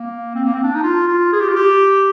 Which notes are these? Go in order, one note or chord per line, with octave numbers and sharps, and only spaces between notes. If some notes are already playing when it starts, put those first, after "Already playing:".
Already playing: A#3
C4
A#3
C4
D4
D#4
F4
F4
G#4
G4
F4
G4